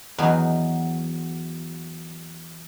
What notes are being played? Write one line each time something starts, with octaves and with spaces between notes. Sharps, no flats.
E2 F#3 B3 D#4 G#5